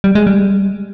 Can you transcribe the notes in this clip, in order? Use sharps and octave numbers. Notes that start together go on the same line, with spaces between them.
G3
G#3
G3